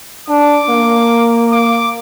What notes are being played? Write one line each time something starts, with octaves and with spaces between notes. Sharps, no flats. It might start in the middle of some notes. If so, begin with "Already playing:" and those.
D4 D6
A#3
D6